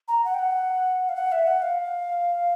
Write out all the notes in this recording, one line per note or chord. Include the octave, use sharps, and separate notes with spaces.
A#5
F#5
G5
F#5
F5
F#5
E5
F#5
F5